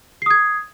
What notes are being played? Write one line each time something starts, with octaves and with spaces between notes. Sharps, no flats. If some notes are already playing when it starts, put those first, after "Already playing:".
D#6 G#6 C7